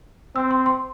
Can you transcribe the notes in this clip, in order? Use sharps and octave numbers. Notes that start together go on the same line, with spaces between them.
C4 E6
C6
C6